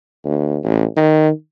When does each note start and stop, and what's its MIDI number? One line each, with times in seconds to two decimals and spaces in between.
0.25 0.58 38
0.63 0.84 33
0.96 1.29 51